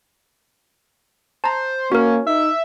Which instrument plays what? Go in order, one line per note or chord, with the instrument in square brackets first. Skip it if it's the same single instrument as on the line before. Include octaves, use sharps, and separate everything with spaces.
[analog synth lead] C5 [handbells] A5 A#5
[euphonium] A#3 [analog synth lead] C#4 [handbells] F#4 A#4
[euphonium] D#4 [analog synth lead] E5